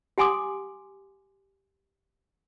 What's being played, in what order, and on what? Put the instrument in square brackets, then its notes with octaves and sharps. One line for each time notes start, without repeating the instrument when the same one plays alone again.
[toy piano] G4 F#5 G#5 C6 D6 D#6